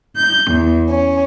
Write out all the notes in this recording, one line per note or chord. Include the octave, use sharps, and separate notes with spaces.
G6
E2
C#4